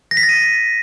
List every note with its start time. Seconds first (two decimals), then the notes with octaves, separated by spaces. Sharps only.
0.11 A#6
0.17 B6
0.23 A6
0.29 D#7